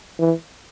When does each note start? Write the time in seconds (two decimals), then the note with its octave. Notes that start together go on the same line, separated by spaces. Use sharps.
0.19 E3